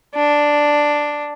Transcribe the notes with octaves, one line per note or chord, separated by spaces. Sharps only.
D4